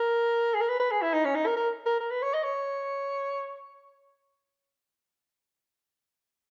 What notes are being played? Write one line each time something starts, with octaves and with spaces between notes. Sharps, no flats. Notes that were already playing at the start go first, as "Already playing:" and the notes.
Already playing: A#4
G#4
A#4
B4
B4
G#4
E4
D#4
C#4
D#4
A#4
A#4
A#4
A#4
B4
C#5
D#5
C#5